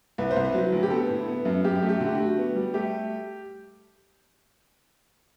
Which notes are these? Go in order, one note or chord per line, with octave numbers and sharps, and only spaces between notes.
C2 B4
C5
C2
B4
F#3
D2 F#4
G4
B3 A4
A2
B3
F#2
F#2 G4
G4
A3
G4
D3 F#4
G4
A3 F#4
B3
G3
A3 G4